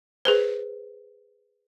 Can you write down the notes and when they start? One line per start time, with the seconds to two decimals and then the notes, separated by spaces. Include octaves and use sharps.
0.25 G#4 B4 C5